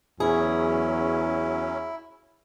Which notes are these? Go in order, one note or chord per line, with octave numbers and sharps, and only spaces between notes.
E2 F#3 C#4 E4 G#4